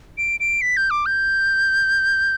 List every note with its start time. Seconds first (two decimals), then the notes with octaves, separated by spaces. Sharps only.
0.18 D7
0.40 D7
0.62 B6
0.77 G6
0.91 D6
1.06 G6